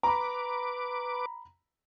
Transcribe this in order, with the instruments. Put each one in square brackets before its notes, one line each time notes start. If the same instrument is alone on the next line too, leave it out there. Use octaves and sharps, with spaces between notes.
[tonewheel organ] B4 D6 [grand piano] A#5 B5